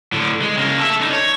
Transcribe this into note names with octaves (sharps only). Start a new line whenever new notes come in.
A2 D3
G#3
C#3 A#3
A4 E5
D4 D#4
C#5